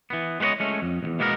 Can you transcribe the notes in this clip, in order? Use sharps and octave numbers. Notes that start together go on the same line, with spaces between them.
E3 B3
G#3 B3 B4 C#5 D#5
G#3 A3 C#4
F2
B1 E2
B2 G#3 A#3 B3 G#4 A#4